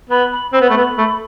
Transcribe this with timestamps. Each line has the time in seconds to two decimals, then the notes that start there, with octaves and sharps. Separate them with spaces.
0.10 B3 B5
0.32 B5
0.53 C4 B5
0.61 B3
0.70 A3
0.77 B3
0.98 A3